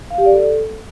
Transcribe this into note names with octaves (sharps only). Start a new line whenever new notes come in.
F5
G4
D5
A4